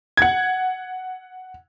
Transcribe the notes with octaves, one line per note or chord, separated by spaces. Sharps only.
F#5 G#6